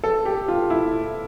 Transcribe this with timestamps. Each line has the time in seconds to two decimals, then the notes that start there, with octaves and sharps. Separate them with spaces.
0.04 A4
0.25 G4
0.48 F4
0.70 E4